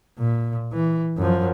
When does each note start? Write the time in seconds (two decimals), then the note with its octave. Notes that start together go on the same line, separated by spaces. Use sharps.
0.18 A#2
0.73 E3
1.17 F#2 F3